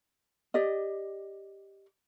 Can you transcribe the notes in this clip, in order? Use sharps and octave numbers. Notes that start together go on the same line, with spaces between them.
G4 D5 D#5